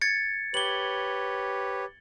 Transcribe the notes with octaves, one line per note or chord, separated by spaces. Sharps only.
G#6 A6 C#7
G4 B4 C#5 F#7 G7